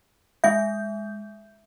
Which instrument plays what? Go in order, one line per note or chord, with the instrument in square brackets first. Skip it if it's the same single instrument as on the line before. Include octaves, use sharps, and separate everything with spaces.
[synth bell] G#3 G6 [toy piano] E5